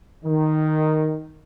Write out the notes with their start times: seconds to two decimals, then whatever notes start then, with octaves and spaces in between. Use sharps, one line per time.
0.25 D#3